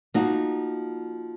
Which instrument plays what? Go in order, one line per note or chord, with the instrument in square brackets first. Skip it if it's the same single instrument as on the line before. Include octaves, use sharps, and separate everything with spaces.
[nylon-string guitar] F3 A#3 D#4 F#4